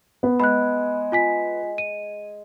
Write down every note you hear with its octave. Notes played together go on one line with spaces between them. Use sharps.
B3
G#3 B5 F#6
F4 G#5 B6
D#7